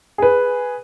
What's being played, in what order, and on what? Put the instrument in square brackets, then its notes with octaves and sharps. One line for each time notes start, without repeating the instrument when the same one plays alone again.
[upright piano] G#4 B4